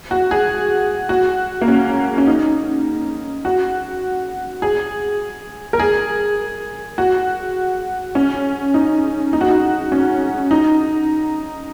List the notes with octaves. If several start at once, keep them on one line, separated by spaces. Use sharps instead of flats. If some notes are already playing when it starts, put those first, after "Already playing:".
F#4
G#4
F#4
A#3
C#4
C#4
D#4
F#4
G#4
A#4
G#4
F#4
C#4
D#4
D#4
F#4
D#4
C#4
D#4